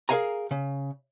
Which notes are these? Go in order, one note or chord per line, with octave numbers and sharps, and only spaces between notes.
G#4 A#4 E5 F5 G#5 A#5
C#3